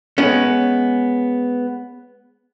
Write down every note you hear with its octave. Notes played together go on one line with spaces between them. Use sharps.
G#3 B3 C#4